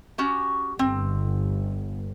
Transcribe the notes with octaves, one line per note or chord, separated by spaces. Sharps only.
C#4 F#4 G4
G1 C4